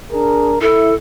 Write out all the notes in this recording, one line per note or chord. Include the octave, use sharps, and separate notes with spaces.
D4 G#4 A#4
E4 A4